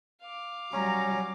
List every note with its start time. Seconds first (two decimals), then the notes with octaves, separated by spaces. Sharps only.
0.21 F5 D6
0.73 F#3 G3 C#4 A#5